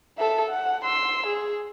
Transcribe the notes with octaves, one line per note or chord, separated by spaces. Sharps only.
A4 E5
F#5
C6 E6
G#4